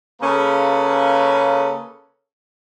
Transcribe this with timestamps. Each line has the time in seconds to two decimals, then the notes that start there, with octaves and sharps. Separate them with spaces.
0.21 C#3 A#3 C#4 G#4 A4 B4